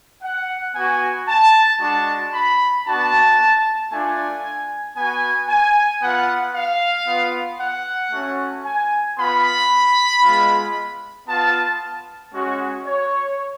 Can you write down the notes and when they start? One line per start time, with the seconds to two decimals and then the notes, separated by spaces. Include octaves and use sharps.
0.23 F#5
0.75 B3 F#4 G#5
1.28 A5
1.80 G#3 D4 F#4 A5
2.33 B5
2.86 B3 D4 F#4 A5
3.91 A3 D4 F4 G#5
4.96 B3 F#4 G#5
5.49 G#5
6.02 B3 F4 F#5
6.55 F5
7.08 B3 F4
7.60 F#5
8.12 A3 C#4 F#4
8.65 G#5
9.18 B3 F4 B5
10.23 G#3 B3 F4
11.28 B3 F4 A5
12.34 G#3 C#4 F#4
12.87 C#5